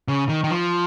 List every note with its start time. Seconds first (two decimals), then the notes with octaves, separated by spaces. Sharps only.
0.08 C#3
0.29 D#3
0.44 D#3
0.50 F3